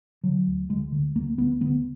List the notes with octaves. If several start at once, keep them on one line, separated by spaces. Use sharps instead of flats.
D3 F#3
D2
D2 G#3
D3
D2 A#3
D2 B3
D3 B3